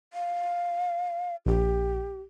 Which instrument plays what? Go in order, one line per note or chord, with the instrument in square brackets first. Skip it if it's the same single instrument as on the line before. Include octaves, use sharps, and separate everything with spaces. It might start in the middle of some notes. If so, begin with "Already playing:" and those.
[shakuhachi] F5
[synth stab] A#1 [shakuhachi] G4